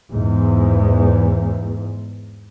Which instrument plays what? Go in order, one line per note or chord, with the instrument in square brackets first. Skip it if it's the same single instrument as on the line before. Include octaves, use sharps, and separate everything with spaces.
[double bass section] E2 G#2